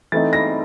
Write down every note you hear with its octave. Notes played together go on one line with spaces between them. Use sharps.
E3 A3 C4 D#4 A6
A#6